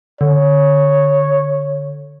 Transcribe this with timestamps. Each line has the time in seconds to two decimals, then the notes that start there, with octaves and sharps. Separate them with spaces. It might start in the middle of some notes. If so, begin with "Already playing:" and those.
0.21 D3 C#5